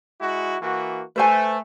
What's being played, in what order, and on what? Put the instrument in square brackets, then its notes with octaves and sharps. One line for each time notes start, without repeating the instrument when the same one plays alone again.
[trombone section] G#3 E4 F#4
E3 A#3 F#4
[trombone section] A3 [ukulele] B4 C5 G#5